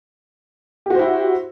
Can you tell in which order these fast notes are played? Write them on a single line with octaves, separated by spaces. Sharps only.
G4 F#4 C5 E4